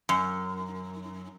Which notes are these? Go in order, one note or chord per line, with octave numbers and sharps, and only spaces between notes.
F#2